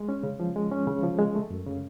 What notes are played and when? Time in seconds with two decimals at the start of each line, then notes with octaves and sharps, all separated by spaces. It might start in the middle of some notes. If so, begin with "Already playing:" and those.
Already playing: G#3
0.09 C#4
0.23 C#3
0.40 F3
0.56 G#3
0.72 C#4
0.87 C#3
1.03 F3
1.19 G#3
1.35 A3
1.50 F#2
1.67 C#3